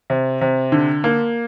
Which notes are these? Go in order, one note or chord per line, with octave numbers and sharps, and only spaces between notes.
C3
C3
D3
A#3